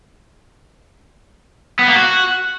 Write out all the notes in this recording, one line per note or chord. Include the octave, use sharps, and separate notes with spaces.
B3
A#3
F#4